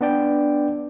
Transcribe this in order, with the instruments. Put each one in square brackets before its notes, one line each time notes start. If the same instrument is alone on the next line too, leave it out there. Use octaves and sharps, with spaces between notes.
[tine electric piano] B3 D4 D5 G5